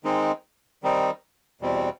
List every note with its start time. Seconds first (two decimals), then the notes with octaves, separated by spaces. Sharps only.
0.04 D#3 G#3 C4 D#4
0.83 D#3 G3 C4 D#4
1.61 E2 B2 G3 C4